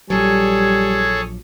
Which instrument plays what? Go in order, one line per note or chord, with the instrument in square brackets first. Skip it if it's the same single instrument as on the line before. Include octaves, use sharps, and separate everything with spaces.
[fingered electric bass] A#1 F#3 [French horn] G3 [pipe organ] G#4 A4 C#5